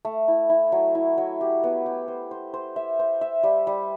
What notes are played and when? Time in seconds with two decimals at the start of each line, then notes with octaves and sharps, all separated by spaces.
0.05 A3
0.28 E4
0.50 E4
0.72 F#3
0.95 E4
1.18 F#3
1.41 G4
1.64 B3
1.86 G4
2.08 C5
2.31 C5
2.54 C5
2.76 E5
2.99 C5
3.21 E5
3.43 G3
3.67 G3